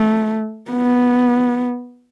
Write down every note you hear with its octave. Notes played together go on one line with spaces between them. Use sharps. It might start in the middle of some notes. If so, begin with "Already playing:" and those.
Already playing: A3
B3